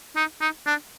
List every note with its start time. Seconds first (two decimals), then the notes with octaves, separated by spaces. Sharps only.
0.16 D#4
0.41 D#4
0.66 D4